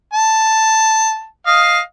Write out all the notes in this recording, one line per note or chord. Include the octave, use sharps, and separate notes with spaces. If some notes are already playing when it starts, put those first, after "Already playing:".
A5
D#5 F5